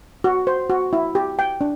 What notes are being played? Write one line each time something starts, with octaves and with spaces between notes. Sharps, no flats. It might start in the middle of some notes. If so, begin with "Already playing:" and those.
F#4
C5
F#4
E4
G4
G5
D4